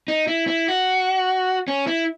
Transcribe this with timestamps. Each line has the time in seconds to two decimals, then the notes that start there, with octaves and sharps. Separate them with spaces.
0.08 D#4
0.28 E4
0.48 E4
0.68 F#4
1.68 C#4
1.87 E4